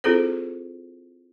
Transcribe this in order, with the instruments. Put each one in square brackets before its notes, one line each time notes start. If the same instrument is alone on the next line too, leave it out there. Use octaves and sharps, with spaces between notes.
[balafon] C4 E4 F4 G#4 A4 C5